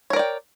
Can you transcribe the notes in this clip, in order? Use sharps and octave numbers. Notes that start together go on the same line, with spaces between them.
A#4 C#5 D5 G5